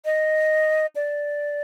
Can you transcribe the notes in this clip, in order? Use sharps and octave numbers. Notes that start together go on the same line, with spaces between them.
D#5
D5